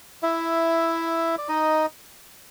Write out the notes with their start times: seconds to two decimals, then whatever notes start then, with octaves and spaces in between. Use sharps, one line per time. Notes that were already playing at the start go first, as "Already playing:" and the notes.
0.23 E4 E5
1.38 D5
1.48 D#4 D#5